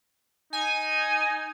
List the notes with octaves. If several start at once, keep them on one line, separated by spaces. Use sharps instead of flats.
D#4 G#5